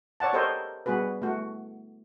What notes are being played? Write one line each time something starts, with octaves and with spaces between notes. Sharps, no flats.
C#5 D5 F#5 A5
G4 A4 A#4 C5 C#5 D#5
G3 B3 F#4 G#4 B4
A3 F#4